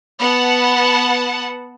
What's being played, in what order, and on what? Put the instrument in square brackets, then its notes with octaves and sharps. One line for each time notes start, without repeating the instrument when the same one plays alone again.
[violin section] B3 F#5 A5